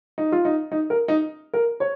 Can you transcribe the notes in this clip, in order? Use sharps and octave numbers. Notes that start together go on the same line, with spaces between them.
D#4
F4
D#4
D#4
A#4
D#4
A#4
C#5